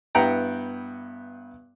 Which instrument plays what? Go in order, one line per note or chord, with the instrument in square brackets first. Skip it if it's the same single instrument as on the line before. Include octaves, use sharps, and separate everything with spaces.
[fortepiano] G2 B3 E4 F#5 G5 A#5